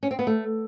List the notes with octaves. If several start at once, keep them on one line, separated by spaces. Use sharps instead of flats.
C#4
C4
B3
A3